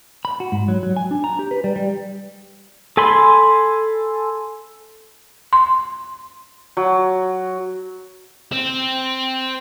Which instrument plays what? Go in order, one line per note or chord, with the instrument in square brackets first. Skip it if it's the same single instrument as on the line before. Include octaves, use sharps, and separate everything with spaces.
[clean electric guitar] B5
F#4
G#2
F#3
F#3
G#5
D4
A#5
G4
B4
G3
G3
[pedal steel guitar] A4 G#5 B5 C6
[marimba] C6
[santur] F#3
[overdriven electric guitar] C4